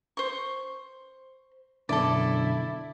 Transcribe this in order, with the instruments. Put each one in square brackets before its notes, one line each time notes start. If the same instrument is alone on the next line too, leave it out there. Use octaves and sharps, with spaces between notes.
[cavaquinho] C5 C#6
[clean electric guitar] F#2 B2 D3 [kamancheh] E4 [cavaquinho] A4 D5